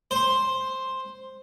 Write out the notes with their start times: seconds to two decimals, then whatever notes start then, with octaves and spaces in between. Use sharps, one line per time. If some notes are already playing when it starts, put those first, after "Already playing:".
0.11 C5 C6